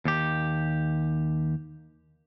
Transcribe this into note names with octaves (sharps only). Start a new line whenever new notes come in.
D#2 G4